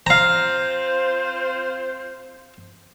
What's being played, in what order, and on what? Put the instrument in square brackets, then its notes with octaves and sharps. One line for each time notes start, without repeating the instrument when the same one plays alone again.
[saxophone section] C4 F4 C5 [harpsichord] F5 A#5